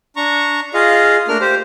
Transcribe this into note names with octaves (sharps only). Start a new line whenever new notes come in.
D4 A#5 C#6
F4 G#4 D#5 F5
A3 A#3 D4 A#4 F6
G4 C5